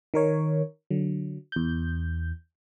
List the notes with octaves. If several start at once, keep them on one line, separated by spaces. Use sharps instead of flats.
D#3 A#4 C#5
D3 F#3
E2 G6